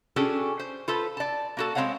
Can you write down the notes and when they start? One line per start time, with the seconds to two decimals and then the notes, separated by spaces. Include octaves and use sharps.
0.16 C#4 D4 F#4 G#4 A4 G5
0.60 C5
0.88 F4 A4 B4 C5
1.17 D5 A5
1.57 A#3 F#4 A4
1.75 G#3 C4 D#4 C#5 F5 F#5